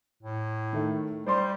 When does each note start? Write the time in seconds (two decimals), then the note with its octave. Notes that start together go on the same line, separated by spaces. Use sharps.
0.23 A2
0.73 D#3 A3
1.26 G3 C5 D5 C6